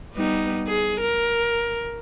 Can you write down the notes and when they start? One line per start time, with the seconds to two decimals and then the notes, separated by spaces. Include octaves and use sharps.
0.14 G3 B3 D#4
0.68 G#4
1.01 A#4